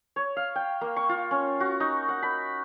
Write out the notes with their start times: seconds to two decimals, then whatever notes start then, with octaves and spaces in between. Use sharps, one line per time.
0.16 C#5
0.36 F5
0.55 G5
0.81 A#3
0.96 C#6
1.09 F4
1.31 C#4
1.60 F#4
1.80 D#4
2.09 F#5
2.23 B5